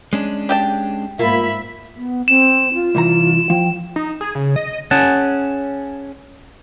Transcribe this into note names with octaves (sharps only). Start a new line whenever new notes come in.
G#3 C#4 D4
G4 G5 A5
G#2 A#3 F4 E5 B5
B3
C4 E7
F4
C2 E3 A#5
F3 G5
D#4
G#4
C#3
D#5
C#4 G#4 F#5 A5